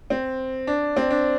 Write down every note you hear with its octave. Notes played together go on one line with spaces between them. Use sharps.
C4
D4
C4
D4